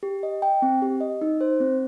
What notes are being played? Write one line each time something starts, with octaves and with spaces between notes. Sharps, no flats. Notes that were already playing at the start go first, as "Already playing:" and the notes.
G4
D#5
G5
C4
G4
D#5
D#4
C5
C4